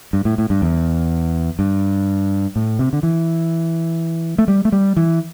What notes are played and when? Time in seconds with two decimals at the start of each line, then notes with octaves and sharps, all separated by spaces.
0.13 G2
0.25 A2
0.38 A2
0.50 G2
0.62 E2
1.59 G2
2.56 A2
2.79 C3
2.93 D3
3.03 E3
4.38 A3
4.48 G3
4.65 A3
4.72 G3
4.97 E3